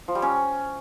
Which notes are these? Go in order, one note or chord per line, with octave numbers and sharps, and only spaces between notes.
F3
G3
C#4